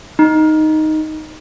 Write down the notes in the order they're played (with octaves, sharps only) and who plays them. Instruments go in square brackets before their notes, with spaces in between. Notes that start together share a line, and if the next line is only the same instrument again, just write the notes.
[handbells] D#4